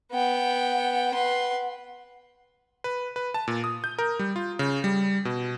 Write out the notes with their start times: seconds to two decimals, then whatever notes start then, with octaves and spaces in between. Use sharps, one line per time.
0.12 B3 F#5 G5
1.14 B4 C6
2.84 B4
3.16 B4
3.34 A5
3.48 A#2
3.64 D#6
3.84 G6
3.99 A#4
4.19 G3
4.36 F4
4.59 C#3
4.84 G3
5.25 B2